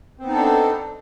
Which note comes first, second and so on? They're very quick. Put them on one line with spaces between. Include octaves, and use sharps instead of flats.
C4 B3 D#4 A4 D4